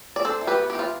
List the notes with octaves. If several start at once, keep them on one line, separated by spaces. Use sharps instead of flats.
D5
D4 A4 C5
E3
G4 B4
B3
G4
E3 F4